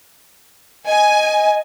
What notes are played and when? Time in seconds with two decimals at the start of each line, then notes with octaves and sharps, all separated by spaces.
0.87 D#5 G#5